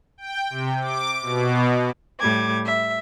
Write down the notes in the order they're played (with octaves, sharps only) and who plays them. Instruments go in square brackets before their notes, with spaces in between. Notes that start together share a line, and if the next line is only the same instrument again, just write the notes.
[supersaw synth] G5
C3
D6
B2
[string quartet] A2 G3 D6 G#6
E5